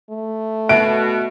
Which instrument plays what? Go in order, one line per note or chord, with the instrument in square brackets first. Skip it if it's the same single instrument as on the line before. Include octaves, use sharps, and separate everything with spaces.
[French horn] A3
[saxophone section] B2 [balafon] E5 [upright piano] D7